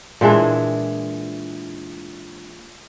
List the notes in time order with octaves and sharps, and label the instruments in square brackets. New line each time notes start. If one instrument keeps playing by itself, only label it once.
[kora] A#2 E3 G#3 D4